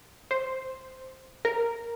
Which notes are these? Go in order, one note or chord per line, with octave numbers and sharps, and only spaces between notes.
C5
A#4